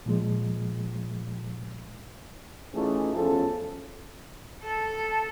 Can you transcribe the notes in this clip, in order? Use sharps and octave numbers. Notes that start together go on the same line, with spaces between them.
A#2 F3 G#3
E3 A3 C#4 D#4 F4 G#4
E2 F3 C#4 A4
A4